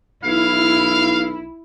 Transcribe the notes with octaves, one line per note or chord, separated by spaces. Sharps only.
B1 E4 F5